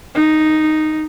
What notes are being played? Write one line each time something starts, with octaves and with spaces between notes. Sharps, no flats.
D#4